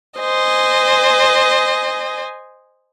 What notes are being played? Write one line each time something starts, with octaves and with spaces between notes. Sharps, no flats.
C5 D#5 G#5